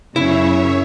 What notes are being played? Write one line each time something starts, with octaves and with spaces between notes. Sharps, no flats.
F#2 C#3 E4 C#5 E5